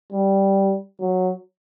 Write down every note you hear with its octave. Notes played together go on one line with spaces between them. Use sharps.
G3
F#3